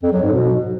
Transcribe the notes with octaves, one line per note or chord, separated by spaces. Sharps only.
F2
F#3
G#2
B2